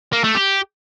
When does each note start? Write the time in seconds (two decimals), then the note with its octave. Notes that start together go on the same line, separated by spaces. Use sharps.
0.13 A#3
0.24 A3
0.35 G4